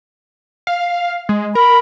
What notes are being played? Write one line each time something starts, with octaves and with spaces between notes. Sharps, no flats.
F5
G#3
A#4 B5